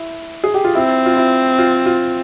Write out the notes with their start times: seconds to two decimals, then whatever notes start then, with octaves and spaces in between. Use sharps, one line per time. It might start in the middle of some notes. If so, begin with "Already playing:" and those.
Already playing: E4
0.44 G#4
0.54 G4
0.64 F4
0.75 C4 E4
1.06 F4
1.16 E4
1.58 F4
1.86 F4